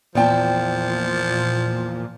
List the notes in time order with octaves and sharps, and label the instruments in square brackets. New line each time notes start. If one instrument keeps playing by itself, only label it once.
[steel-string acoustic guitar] E2 G5 A5 [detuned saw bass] A#2 [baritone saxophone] F3